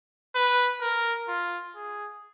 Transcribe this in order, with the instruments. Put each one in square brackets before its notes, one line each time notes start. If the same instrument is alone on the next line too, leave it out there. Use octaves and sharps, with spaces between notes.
[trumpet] B4
A#4
F4
G#4